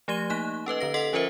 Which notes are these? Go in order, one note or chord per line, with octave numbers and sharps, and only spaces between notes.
F3 A3 G4 G#6 D#7 G7
A#3 D#4 F#6
C#4 A4 B4 D#5
D3 B4 A#6
A4 D#5 F#5 C6 B6
F3 C#4 F4 A#4 C5 E5